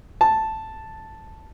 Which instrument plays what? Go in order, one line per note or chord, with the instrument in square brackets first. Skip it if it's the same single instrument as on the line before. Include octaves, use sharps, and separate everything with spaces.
[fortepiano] A5